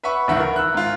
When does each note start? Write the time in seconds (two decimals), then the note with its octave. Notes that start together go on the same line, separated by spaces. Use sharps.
0.03 B4 E5 F#5 B5 C#6
0.28 D1 C#2 D#3 E5 F#5
0.40 A#4
0.56 E6 F#6
0.75 G#2 F4